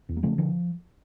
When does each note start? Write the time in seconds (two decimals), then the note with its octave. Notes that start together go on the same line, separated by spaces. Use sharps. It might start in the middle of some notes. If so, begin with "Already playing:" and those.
0.09 E2
0.17 A#3
0.23 C#3 F3 A3
0.38 D3 F3